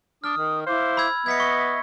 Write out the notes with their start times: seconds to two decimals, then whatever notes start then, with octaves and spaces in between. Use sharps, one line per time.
0.24 D4 D#6 F6
0.38 D#3
0.66 E4 C5 F5 D6
0.97 B5 E6 G#6
1.26 B3 D#5 E5 G#6 B6 C#7
1.40 C#6